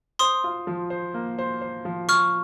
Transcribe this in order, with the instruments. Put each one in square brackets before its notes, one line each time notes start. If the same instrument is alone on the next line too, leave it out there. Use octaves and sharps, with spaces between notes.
[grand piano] C5 [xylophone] C6 D#6
[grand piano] F4
F3
C5
A#3
C5
C5
F3
[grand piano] F3 [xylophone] C#6 F6